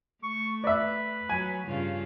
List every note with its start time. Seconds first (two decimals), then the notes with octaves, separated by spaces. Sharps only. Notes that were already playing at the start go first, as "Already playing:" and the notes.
0.23 A3 C#6
0.64 B4 D5 E5
1.29 F#3 G#5
1.67 G2 C#3 F4